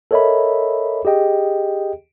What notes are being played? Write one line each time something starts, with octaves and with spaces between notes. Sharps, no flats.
A4 A#4 C#5 D#5 E5 B5
G4 G#4 D#5 G5